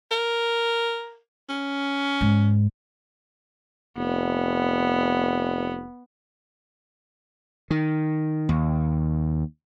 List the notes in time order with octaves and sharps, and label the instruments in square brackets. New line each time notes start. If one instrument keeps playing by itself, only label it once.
[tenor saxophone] A#4
C#4
[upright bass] G#2
[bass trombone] F1 [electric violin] B3
[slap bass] D#3
D#2